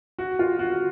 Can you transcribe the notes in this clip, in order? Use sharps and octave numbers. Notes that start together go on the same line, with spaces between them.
F#4
F4
F#4